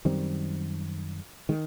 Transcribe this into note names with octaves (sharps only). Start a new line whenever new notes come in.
F#2 D#3 G3 C4
D#3 G#3